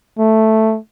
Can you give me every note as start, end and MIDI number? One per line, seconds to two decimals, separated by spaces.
0.19 0.78 57